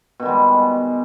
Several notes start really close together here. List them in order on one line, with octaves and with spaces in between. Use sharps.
B2 D#3 G3 G#3